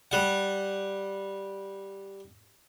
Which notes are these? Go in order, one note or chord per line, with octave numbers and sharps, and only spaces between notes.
G3 F#5